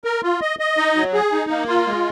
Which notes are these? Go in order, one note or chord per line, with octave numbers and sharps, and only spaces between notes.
A#4
F4
D#5
D#5
D#4
F#3
G#4
D#4
A#3
F4
G#3